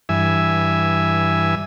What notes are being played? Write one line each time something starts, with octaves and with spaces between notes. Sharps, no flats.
G2 E3 E5 G#5